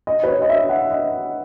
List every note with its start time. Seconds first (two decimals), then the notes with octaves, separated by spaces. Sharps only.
0.07 D#5
0.24 B4
0.28 C#5
0.42 D#5
0.49 E5
0.69 F#5
0.91 D#5